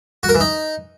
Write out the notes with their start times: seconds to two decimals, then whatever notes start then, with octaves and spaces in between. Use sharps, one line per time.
0.23 F#4
0.29 A#4
0.35 E3
0.40 D#4